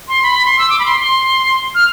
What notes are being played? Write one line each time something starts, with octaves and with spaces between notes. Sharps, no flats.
C6
B5
C6
E6
D6
B5
C6
C6
F6